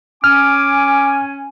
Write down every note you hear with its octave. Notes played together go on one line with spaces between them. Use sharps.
C#4 G#5 D6 F6